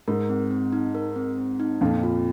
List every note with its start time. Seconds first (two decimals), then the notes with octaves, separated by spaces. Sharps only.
0.08 G#2 A#4
0.29 C4
0.51 C4
0.72 D#4
0.95 A#4
1.16 C4
1.38 C4
1.60 D#4
1.81 F2 A#2 F5
2.03 F4